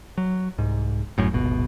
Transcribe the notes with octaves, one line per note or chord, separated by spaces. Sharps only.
F#3
C2 G#2
G1 F#2 A2
D#1 G#1 B2